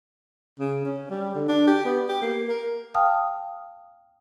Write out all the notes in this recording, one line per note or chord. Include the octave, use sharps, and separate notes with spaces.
C#3
C#4
G3
D3
D4
G4
B3
G4
A#3
A#4
F5 G5 A5 D#6 F6